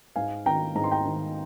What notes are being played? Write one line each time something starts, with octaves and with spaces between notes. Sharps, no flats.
G#2 F5 G#5
D#3 G5 A#5
G#2 A#5
C6
G5 A#5
D#3